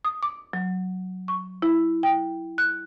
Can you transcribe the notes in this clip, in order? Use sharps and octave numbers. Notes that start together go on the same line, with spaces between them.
D#6
D6
F#3
C#6
E4
G5
F#6